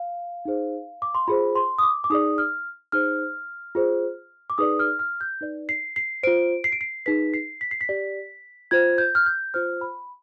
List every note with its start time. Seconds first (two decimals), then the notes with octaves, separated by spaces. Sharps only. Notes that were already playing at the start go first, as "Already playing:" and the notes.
Already playing: F5
0.45 D#4 G#4 C5
1.02 D6
1.14 C6
1.28 F4 G#4 C5 B5
1.55 C6
1.78 D#6
1.83 D6
2.04 D6
2.10 D#4 G#4 D5 D#6
2.38 F6
2.92 D#4 G#4 C5 F6
3.75 F4 G#4 C5
4.50 D6
4.58 D#4 G#4 B4 D5 D#6
4.79 F6
4.99 F6
5.21 G6
5.41 D#4 B4 D5
5.69 C7
5.96 C7
6.23 F4 C5 D7
6.64 C7
6.72 D7
6.81 C7
7.06 D#4 G#4 B4 B6
7.34 C7
7.61 B6
7.71 C7
7.81 B6
7.89 G4 D5
8.71 F4 C5 G#6
8.98 G6
9.15 F6
9.26 G6
9.54 F4 C5 F6
9.81 B5